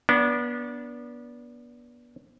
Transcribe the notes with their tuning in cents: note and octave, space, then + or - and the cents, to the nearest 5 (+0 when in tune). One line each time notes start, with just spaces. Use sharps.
B3 -30 D4 -20